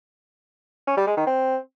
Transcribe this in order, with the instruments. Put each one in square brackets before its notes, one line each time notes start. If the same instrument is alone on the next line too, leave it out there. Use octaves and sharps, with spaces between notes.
[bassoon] C#4
G3
G#3
D#3
C4